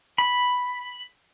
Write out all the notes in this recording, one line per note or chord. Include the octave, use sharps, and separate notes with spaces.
B5